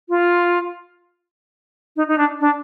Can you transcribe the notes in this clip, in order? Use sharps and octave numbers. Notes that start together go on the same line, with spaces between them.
F4
D#4
D#4
D4
D4